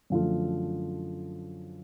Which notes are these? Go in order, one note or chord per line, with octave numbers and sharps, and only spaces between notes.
F#2 D3 F3 A3 F4